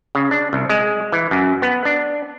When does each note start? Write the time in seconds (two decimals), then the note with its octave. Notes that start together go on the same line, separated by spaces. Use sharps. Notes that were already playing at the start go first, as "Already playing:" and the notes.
0.15 C#3
0.31 D4
0.53 C2
0.69 G#3
1.12 E3
1.31 F#2
1.62 B3
1.85 D4